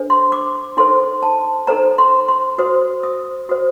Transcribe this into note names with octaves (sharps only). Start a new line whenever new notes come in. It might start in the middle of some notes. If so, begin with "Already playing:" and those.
Already playing: D4 A4 C5
C6
D6
D#4 A4 C5 C6
A5
D#4 A4 C5 A#5
C6
C6
F#4 C5 D#6
D#6
F#4 C5 D#6